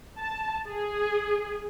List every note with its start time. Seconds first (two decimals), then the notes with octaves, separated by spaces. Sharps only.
0.18 A5
0.68 G#4